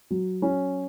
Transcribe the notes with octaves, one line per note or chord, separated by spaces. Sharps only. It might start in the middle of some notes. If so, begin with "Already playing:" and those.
F#3
C#4